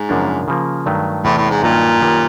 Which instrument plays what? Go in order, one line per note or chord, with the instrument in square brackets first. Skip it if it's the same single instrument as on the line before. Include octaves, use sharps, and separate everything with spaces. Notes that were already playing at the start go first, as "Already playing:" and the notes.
Already playing: [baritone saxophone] G#2
[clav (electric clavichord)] F#2 C#3 F3 A#3 D4
C#3 F3 A#3
G2 D#3 F#3 A3
[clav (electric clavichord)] E2 C3 E3 [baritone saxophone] A2
[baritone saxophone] A2
G#2
[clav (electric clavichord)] G2 D#3 F#3 A#3 D#4 [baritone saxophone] A#2
[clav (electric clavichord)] F#2 D#3 G3 B3